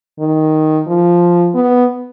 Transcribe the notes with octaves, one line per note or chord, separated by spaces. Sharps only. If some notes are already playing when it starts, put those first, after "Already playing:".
D#3
F3
B3